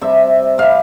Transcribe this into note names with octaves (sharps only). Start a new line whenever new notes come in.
C3 G3 E5
C3 G3 F5